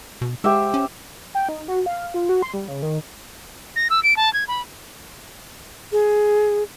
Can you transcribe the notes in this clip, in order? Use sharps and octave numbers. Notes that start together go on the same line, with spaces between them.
B2
G#3 G4 C5 E5
C#4
G5
D#4
F#4
F5
F4
F#4
C6
G3
C#3
D#3
A#6
E6
D7
A5
G#6
B5
G#4